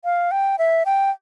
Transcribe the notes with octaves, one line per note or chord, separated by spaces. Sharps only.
F5
G5
E5
G5